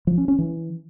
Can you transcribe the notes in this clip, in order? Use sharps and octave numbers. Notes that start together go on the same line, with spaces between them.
F3
C#4
C#4
E3